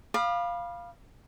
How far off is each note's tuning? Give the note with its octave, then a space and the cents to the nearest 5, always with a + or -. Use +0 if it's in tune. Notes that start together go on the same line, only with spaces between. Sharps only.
F5 +0 B5 -20 D6 +40